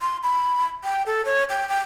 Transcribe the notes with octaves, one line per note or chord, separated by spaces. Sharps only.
C6
B5
G5
A4
C#5
G5
G5